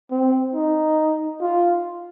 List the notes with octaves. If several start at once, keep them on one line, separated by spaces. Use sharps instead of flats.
C4
D#4
F4